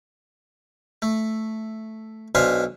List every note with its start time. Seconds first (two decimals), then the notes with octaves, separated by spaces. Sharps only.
1.02 A3
2.35 B1 D4 C5 E5 F5 G#5